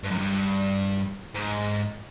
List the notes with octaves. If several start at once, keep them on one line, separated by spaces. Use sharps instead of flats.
G2
F#2
G2
G#2